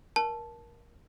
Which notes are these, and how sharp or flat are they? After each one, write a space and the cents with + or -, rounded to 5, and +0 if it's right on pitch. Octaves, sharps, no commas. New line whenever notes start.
A#4 +20 A5 -10